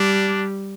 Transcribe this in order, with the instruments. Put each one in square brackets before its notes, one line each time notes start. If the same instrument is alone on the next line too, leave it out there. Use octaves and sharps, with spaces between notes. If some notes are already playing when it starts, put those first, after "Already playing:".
Already playing: [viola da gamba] G3 [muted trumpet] D4